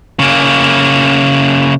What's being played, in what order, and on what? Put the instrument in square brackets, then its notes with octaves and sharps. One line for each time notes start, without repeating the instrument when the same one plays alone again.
[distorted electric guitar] C#3 A#3